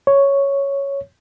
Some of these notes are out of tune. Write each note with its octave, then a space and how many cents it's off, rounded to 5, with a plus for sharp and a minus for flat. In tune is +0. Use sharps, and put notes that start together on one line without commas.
C#5 +0